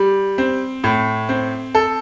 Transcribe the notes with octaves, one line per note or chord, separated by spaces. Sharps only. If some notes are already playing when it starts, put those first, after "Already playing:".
Already playing: G3
C4
A2
C4
A4